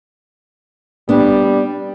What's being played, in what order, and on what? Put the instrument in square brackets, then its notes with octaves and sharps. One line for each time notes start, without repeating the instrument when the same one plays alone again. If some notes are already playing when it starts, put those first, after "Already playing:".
[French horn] G3 [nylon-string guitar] B3 D4